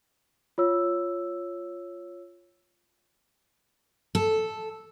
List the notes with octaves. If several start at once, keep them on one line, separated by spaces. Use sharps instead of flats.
F4 C#5 E6
A4